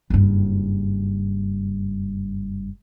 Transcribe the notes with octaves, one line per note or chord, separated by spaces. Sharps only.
F#1 G2